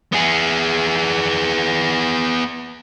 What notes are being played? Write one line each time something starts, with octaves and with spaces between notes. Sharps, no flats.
B3 G#4